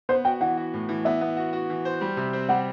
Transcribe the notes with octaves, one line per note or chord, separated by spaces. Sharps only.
B3 C5
F#4 G5
E3 F#5
F#4
A2
E3
B3 E5
B3
F#4
F#4
E3
C5
G3
C3
C4
G3 F#5